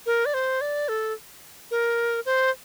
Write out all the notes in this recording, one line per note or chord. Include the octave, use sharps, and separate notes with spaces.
A#4
D5
C5
D5
A4
A#4
C5